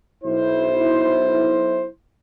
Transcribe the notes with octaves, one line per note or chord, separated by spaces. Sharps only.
B1 E4 C5